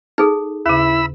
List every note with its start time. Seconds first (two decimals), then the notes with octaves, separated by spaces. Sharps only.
0.18 D#4 G#4 A4 F6
0.66 D#2 C#3 E4 B5 E6